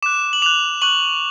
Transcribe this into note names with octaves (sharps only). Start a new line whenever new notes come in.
D6 F#6 E7
F#7
D6 F#6 F7
C#6 F#6 F#7